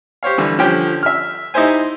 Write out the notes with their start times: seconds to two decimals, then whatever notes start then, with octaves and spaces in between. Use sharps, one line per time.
0.23 G4 C5 C#5 F5
0.38 D3 E3 G3
0.58 D3 F3 C#4 G4 G5
1.03 E5 F6
1.54 D#4 E4 G4 C5 G#5